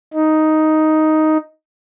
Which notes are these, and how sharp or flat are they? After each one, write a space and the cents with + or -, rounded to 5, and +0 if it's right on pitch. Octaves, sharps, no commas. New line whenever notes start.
D#4 +5